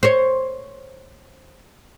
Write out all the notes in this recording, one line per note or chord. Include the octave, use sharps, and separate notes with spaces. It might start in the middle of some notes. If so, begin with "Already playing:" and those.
C5 C#5